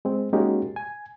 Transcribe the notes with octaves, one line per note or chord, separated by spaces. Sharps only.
G#3 C4
G#3 A#3 C#4 D#4 F#4 G4
G#5